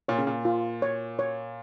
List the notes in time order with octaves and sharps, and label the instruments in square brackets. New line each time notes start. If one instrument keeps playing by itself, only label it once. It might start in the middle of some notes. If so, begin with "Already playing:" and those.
[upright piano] A#2 [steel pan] C#5
[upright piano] C#3
A#2
[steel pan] F4
C#5
C#5